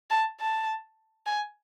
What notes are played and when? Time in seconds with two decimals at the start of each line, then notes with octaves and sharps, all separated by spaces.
0.10 A5
0.40 A5
1.26 G#5